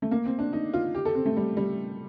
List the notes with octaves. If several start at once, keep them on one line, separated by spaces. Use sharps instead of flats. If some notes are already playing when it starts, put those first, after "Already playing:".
A3
A#3
C4
D4
D#4
F4
G4
A4
C4
A3
G3
G3